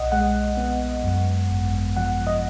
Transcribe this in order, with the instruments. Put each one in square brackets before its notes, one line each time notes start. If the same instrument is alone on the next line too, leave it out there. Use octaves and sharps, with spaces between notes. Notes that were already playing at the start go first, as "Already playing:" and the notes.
Already playing: [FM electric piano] B1 A#2 D#5 F#5
G#3 F#5
B3
F#2
G#1
F3 F#5
D#5